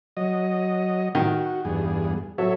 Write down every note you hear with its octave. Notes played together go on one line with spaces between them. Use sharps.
F#3 D#5
D#3 F#4
E2 G2 G#4
F#3 A4 C#5 E5